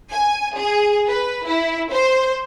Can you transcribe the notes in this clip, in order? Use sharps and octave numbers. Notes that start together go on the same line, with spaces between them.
G#5
G#4
B4
E4
C5